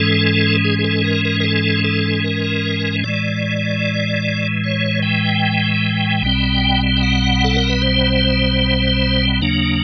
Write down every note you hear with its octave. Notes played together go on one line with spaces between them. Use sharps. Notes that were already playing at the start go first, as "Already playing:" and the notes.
Already playing: G#2 E3 G#3 C#4 A4
G#4
G#4
A4
A#4
A#4
A#4
A4
A4
A#4
A2 E3 G#3 D5
C#5
G5
B1 B2 G3 C4
G5
F#5
A4
A#4
B4
C5
D#2 C#3 F#3 A#3 D4